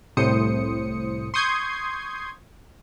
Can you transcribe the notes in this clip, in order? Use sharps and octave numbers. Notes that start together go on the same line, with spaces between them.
C2 A2 C5 D#6 C#7
C6 C#6 D#6 G6 G#6 C7